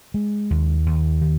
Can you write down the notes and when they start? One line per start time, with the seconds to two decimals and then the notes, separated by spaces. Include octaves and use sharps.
0.14 G#3
0.50 D#2
0.86 D#2
1.22 D#3